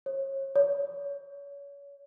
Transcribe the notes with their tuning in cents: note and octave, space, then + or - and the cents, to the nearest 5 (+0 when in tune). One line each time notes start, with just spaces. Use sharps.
C#5 -35
C#5 +30